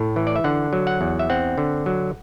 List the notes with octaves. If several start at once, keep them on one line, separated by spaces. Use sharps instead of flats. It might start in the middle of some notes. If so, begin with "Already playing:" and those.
Already playing: A2
E3
D5
E5
D3 F#5
F#3
F#5
E2
E5
C4 F#5
D3
F#3